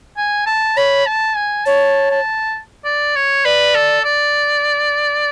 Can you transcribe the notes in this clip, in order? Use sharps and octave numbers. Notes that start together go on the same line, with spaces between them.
G#5
A5
C#5 B5
A5
G#5
C#5 A5
A5
D5
C#5
B4 D5
A4
D5